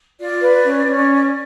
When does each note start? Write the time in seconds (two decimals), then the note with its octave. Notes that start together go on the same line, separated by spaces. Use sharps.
0.18 F4 D5
0.41 B4
0.64 C#4
0.87 C#4